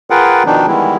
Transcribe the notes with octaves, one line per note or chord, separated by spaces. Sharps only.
F4 G#4 A#4 B4 F#5 G5
B2 D#3 F3 D4 D#4
D#3 E3 G3 G#3 B3 E4